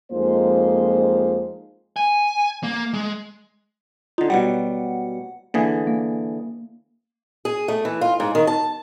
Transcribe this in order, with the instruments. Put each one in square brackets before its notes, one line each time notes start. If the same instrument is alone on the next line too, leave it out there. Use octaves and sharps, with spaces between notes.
[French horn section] F2 G#3 A#3 D#4 F4 C5
[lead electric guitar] G#5
A#3
G#3
[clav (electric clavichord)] D3 D#4 [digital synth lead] F4
[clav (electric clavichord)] B2 F#3 G3 [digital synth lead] F#5
[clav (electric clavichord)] D3 E3 G#4 [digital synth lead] A#3
[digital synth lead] A#3
[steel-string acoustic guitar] G#4
A3
E3
F4
G#2
D#3
A5